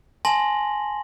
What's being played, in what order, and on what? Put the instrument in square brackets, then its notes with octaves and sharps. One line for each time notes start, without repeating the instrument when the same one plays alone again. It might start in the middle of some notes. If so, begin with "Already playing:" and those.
[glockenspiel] G#5 A5 C6 A#6 F#7